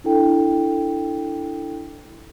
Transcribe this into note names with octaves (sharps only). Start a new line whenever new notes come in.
D4 E4 A4 G5